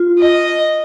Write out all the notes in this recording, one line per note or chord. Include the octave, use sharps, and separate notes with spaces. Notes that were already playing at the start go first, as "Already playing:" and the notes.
Already playing: F4
D#5